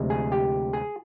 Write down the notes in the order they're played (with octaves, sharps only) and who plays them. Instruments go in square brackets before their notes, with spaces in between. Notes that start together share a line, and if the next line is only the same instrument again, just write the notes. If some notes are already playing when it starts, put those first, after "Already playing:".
Already playing: [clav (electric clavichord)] D2 C3 F3 G#3
G#4
G4
G#4